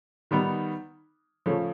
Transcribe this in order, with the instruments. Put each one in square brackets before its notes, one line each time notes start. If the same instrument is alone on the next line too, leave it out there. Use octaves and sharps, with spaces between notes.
[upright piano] D#3 G3 B3 D#4
C#3 F3 A3 C#4